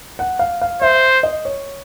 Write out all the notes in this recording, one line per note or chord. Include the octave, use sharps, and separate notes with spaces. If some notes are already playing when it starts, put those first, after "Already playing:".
F#5
F5
F5
C5 E5
D#5
C#5